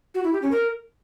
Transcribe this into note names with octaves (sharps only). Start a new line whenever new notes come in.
F#4
E4
G4
C#4
A#4